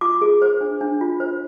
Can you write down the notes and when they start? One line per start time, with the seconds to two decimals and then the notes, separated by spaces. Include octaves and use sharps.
0.01 F4 D6
0.22 G#4
0.42 C5
0.61 D4
0.81 D4
1.01 F4
1.20 C5